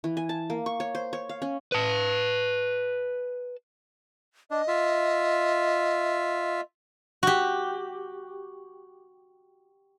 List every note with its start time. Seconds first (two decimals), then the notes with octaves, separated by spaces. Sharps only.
0.04 E3
0.17 G#5
0.29 A5
0.50 A#3
0.66 C#6
0.80 C#5
0.95 C5
1.13 C#5
1.29 F5
1.42 C#4
1.72 B4 A5
4.51 D4 D#5
4.68 F4 E5
7.23 F#4 G4